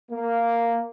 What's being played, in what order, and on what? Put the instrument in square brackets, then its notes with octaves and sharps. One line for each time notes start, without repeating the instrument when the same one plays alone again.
[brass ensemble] A#3